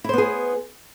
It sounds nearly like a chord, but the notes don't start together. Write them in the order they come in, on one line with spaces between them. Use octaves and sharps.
E4 C5 B3 G#4